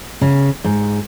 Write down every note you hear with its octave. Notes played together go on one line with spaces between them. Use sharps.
C#3
G#2